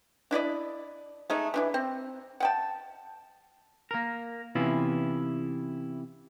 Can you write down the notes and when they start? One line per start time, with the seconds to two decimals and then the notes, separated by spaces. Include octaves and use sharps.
0.31 D4 E4 D5 D#5
1.30 G#3 A3 D#4
1.54 E3 D4 E4
1.74 C4
2.40 F#5 G5 A5
3.91 A#3 A#4
4.55 C3 E3 B3 C#4 E4 F4